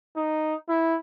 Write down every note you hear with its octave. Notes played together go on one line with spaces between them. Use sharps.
D#4
E4